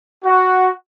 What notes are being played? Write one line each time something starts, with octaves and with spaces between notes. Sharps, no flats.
F#4